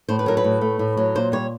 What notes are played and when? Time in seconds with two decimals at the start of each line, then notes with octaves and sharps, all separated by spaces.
0.09 A2 C5
0.19 B4
0.26 F#3 A#4
0.37 B4
0.44 A2
0.61 A3
0.79 A2
0.97 F#3
1.15 A#2 C5
1.32 G3 C#5